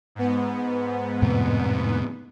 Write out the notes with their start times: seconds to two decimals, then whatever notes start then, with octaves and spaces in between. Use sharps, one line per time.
0.15 G#2 B3
1.22 F2 A2 C3